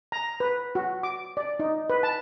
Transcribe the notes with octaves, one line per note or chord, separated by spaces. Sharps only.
A#5
B4
F#4
D6
D5
D#4
B4
A5